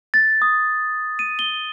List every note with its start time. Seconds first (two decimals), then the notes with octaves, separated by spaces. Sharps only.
0.14 A6
0.42 D#6
1.19 D#7
1.39 G7